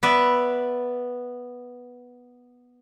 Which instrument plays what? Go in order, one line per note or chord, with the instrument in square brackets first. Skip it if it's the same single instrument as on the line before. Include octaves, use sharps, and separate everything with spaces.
[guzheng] B3 B4 D5 E5